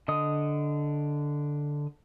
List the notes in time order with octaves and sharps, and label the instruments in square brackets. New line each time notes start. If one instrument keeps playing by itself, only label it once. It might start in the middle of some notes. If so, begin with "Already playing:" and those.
[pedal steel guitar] D3 D#5 D#6